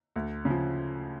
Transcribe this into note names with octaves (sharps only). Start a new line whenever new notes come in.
D2
C#3
F3